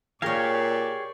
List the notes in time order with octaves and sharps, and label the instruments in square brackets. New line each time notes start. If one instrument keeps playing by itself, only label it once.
[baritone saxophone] A#2 [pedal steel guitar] G4 G#4 F5 [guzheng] A#4 C#5 [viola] D5 C#6